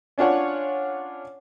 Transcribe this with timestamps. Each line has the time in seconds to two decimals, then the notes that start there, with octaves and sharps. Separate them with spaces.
0.18 C#4 D4 F4 C#5 F#5